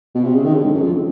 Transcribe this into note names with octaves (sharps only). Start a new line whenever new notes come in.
B2
C3
C#3
D#3
D3
G#2
F#2
F2